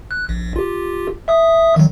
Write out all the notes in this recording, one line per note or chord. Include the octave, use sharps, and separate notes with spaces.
F#6
A#1
F4 G4
E5 D#6
D#3 F#3